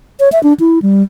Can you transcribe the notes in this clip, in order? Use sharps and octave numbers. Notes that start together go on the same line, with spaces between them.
C#5
E5
D4
E4
G3